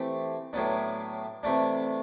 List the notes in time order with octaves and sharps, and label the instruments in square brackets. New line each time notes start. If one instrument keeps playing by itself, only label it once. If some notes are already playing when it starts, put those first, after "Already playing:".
Already playing: [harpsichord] E3 A3 C4 G4
A2 F#3 B3 D4
C3 E3 A3 D4